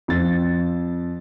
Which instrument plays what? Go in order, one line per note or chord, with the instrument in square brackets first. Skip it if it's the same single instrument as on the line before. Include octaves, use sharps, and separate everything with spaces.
[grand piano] F2 A6